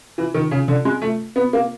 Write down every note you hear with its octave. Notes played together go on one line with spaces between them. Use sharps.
E3
D#3
C#3
D3
G#3
A3
B3
A#3